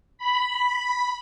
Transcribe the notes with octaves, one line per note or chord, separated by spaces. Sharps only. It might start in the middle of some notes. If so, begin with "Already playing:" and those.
B5